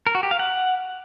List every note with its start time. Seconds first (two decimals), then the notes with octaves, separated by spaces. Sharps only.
0.07 A#4
0.15 F#4
0.23 G4
0.31 F5
0.39 F#5